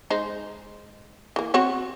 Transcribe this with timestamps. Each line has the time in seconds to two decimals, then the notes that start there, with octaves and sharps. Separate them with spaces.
0.10 G#3 D#4 C5
1.36 E3 A#3
1.54 C4 F#4 C#5